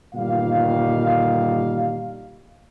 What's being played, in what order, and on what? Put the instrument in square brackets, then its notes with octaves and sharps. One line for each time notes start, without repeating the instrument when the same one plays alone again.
[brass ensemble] G1 A#2 D#3 G3 F5